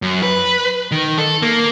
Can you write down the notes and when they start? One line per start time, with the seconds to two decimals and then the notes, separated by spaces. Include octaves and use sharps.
0.02 F#2
0.23 B4
0.91 D#3
1.18 A4
1.42 A#3